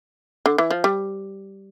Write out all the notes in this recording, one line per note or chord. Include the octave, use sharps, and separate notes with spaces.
D3
E3
F3
G3